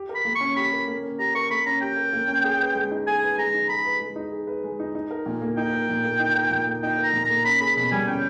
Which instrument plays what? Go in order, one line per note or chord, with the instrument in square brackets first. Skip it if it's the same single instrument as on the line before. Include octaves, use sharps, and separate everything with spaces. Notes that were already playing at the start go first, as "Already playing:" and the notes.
Already playing: [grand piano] G4
A#4
[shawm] B5
[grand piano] A#3
[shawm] C#6
[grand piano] C#4
[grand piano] G4 [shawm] B5
[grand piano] A#4
A#3
C#4
[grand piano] G4 [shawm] A#5
[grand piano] A#4 [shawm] C#6
[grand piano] A#3 [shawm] B5
[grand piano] C#4 [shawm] A#5
[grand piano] G4 [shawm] G5
[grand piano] A#4
A#3
C#4
G#4
B4
G#3
D#4
[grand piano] G#4 [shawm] G#5
[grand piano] B4
[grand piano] G#3 [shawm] A#5
[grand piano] D#4
[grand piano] G#4 [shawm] B5
[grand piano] B4
G#3
D#4
G#4
B4
G#3
D#4
D#4
A#4
A#2
A#3
[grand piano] D#4 [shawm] G5
[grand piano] A#4
A#2
A#3
D#4
A#4
A#2
A#3
[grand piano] D#4 [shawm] G5
[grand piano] A#4
[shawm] A#5
[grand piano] A#2
[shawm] A#5
[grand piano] A#3
[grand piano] C#4 [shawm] B5
[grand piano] G#4 [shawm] B5
[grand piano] B2 [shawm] B5
[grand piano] G3 [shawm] G#5
[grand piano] C#4 [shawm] G5